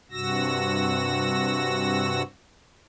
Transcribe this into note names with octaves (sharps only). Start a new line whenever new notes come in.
G2 C3 F#4 E6 A#6